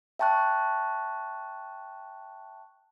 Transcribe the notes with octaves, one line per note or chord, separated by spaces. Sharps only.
E5 G5 A5 C#6 F#6